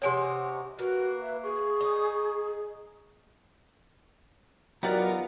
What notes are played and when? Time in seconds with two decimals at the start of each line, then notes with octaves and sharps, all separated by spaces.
0.02 C3 C#4 D#4 C#5 F#5 G#5 C6
0.79 A#3 F#4 B4
1.22 E5
1.43 G#4 C#6
1.81 D#4
4.83 F#3 B3 D#4 F4 G4 A#4 D5 F#5